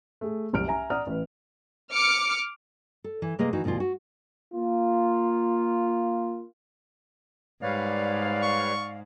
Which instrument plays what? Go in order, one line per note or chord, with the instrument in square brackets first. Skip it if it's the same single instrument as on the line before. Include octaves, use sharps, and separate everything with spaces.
[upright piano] A3 G#4
F#1 C2 F6 D7
E5 G#5 A#5
D5 F#5 A#5 D#6 F6
A1 B4
[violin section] D6 F6 C#7
[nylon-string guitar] A4
E3
C3 A#3 G#4 B4 D#5
D#3 E3 D#4 F#4
D2 B2 D#3 E3 F4
F#4
[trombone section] A#3 F4
[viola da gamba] G#2 [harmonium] G3 B4 C#5 [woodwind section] D5 F5
[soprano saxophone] C#6